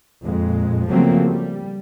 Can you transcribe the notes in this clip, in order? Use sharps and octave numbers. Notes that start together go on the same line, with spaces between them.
F2 A#2 G#3
C#3 F3 F#3 A3 A#3 C4
G3